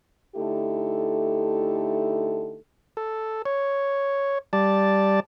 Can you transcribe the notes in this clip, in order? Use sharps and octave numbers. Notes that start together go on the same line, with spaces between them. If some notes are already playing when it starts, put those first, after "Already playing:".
D3 A3 D#4 E4 G4 A4
A4
C#5
G3 D5 A5